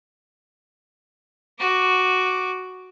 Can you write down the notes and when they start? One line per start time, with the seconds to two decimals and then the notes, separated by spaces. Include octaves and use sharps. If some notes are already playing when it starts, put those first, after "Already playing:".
1.59 F#4 D6